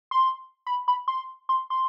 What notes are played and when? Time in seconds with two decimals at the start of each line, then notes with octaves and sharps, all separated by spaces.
0.11 C6
0.67 B5
0.88 B5
1.08 C6
1.49 C6
1.70 C6